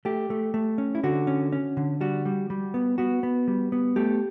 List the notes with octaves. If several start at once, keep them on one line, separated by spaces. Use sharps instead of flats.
A3 G4
A3
A3
C#4
E4
D3 F#4
C#4
C#4
D3
G3 F#4
G3
G3
B3
B3 F#4
B3
G3
B3
A3 G4